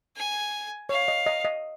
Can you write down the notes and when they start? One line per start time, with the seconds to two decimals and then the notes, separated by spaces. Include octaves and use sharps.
0.17 G#5
0.89 C#5 F5
1.08 D#5
1.26 D#5
1.45 D#5